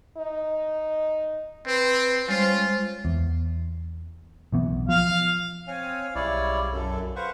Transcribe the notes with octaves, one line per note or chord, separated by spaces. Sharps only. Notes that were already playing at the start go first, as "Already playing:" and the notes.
D#4
C4 B4
G3 G#3 C#4 F4 C5
E2
B1 E3 B3
F3 F5
C4 C#5 F5 G#5
B1 C#3 G3 E4 C#5 D5
F#2 A4
B4 C5 F5 F#5 C#6